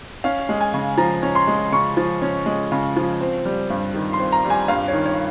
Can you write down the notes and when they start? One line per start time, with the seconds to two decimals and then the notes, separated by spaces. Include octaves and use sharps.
0.24 C#4 F5
0.49 G#3
0.60 G#5
0.74 C#3
0.98 F3 A#5
1.23 C#4
1.35 C6
1.47 G#3
1.72 C#3 C#6
1.97 F3
2.22 C#4
2.46 G#3
2.72 C#3
2.97 F3
3.20 C4
3.45 G3
3.70 G2
3.95 D#3
4.13 C6
4.19 C4
4.32 A#5
4.45 G3
4.50 G#5
4.68 G2 F5
4.88 C#5
4.93 D#3
5.06 C#5